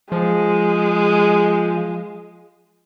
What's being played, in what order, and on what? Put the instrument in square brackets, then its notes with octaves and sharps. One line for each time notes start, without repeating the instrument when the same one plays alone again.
[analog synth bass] F3 [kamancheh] G#3